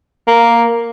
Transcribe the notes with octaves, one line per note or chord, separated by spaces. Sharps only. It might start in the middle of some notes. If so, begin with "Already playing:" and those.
A#3